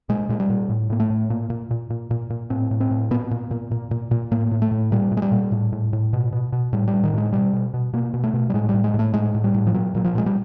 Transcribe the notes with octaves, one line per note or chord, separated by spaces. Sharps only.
A#2 G#3
A#2 G#3
G3
A#2
A2
A2 A#3
A3
A2
A#2 A#3
A#2
A#2
A#2
A#2
A#2
A2 C4
A2
C4
A2
A#2 B3
A#2
A#2
A#2
A#2
A#2
A2 A#3
A2
A3
A2
A#2 G3
A#2
G#3
G3
A#2
A2
A2
A2
B2
B2
B2
A2 G3
G3
A2
D#3
A2 G#3
B2 G3
B2
B2
B2 A#3
B2
A3
B2
G3
A2 G#3
A2 G3
G#3
A2
A3
A2 G#3
A2
G3
A2
F3
A#2 F#3
A#2 F#3
F3
A#2 G#3
G3